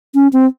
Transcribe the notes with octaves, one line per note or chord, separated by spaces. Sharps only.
C#4
C4